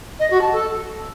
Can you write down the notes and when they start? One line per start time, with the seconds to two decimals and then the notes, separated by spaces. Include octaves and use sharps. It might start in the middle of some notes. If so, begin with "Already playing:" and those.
0.19 D#5
0.30 F#4
0.41 A5
0.52 A4